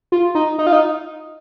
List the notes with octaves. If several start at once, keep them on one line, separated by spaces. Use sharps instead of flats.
F4
D#4
D#4
F4
D#4